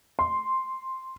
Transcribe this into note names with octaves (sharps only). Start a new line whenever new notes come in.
C6